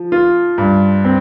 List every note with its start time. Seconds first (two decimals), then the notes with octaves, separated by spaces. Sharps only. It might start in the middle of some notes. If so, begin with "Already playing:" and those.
Already playing: F3
0.12 F4
0.58 G2
1.05 C4